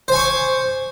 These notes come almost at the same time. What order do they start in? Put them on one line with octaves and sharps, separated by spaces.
C5 G#5 C#6 D6